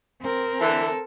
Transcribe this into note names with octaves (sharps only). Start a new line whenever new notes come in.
C4 A#4
D3 E3 A4